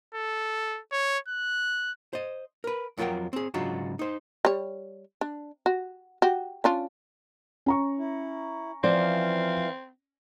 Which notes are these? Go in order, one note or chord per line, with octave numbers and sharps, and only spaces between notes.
A4
C#5
F#6
C5 D#5
A#4 B4
F2 F#3 F4 A#4 F#5 G5
C4 G#4
G#2 C#3 F#3 D4 F4 F#4
D#4 C5
G3 C#5
D4
F#4
F#4 G4
C#4 D4 F4
C#4 A#5 C#6
E4
E3 F3 C4 D5 F5